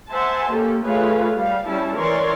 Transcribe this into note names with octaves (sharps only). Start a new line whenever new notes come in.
C5 E5 F#5 G#5 A5 C6
A#3 C#4 G4 A4
A3 F4 G#4 B4 C#5 F5
G3 F5
G3 C#4 E4 A5
E3 A#4 C#5 D5 C6